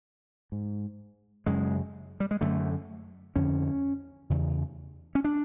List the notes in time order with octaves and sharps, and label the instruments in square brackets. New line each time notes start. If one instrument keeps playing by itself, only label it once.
[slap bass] G#2
F#2 C#3 G#3
G3
G#3
F#2 D3 A3
F2 D3 C#4
E2 C#3
C#4
D4